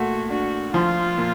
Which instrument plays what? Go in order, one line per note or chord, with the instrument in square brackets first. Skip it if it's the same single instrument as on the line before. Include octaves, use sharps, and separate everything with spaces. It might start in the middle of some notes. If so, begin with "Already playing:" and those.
Already playing: [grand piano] A#2 A3 [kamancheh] F#4
[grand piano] D4 [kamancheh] F#4
[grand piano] F3 [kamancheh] F4
[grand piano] A#2